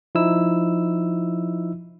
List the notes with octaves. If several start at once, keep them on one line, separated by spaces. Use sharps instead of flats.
F3 D#4 E4 E6